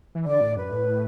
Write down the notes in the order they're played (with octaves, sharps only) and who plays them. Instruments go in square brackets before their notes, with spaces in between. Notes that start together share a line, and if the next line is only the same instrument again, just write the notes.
[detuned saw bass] E3
[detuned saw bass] D3 [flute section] D5
[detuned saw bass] A2
[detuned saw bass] F#2 [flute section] B4
[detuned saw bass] A2